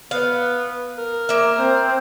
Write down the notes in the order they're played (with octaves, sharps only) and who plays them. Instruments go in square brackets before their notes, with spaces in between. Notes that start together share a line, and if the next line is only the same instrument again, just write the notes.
[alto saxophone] B3 [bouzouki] F5
[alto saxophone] A#4
[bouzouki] A#3 E5
[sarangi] C4